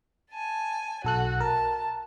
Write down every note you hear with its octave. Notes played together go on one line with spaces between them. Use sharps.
G#5 A5
B1 F#4 A4 F#6
A#4 A5